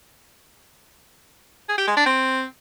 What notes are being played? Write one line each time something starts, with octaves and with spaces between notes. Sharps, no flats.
G#4
G4
G#3
D4
C4